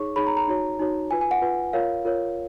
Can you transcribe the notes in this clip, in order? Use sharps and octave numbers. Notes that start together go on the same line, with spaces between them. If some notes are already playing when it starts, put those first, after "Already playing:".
Already playing: D#4 G#4 C#5 C#6
D#4 G#4 C#5 B5
A#5
A#5
D#4 F#4 C#5
D#4 F#4 C#5
F4 B4 G#5
G#5
F#5
F4 B4
F4 A#4 C#5 F5
F4 A#4 C#5